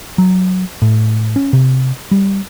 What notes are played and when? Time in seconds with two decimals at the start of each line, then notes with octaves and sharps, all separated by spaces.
0.18 F#3
0.82 A2
1.36 C#4
1.53 C3
2.11 G3